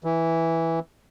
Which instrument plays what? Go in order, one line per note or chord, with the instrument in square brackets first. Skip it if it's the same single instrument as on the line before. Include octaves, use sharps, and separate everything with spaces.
[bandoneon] E3